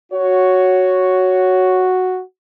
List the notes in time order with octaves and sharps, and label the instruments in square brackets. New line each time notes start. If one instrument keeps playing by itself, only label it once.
[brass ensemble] F#4 [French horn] C#5